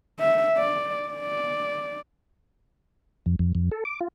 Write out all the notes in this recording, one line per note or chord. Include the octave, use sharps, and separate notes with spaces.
E5
D5
D5
F2
F2
F2
A4
D6
F4